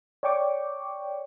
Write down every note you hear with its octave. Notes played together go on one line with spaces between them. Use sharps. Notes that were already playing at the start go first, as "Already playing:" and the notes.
C#5 D5 G5 C#6 D6